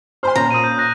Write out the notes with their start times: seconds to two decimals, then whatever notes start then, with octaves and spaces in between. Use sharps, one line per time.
0.23 C5 G#5 B5 C6 F6
0.36 A#2 C#4 A#5 F6
0.51 D#6 D#7
0.64 G6
0.78 F#6 A#6